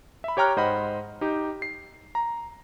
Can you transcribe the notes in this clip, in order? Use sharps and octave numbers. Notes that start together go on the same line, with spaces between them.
E5 B5
G4 C#5 G5 A#5 F6 F#6
G#2 C5 D#5 F#5 B5
D#4 G4
C7
A#5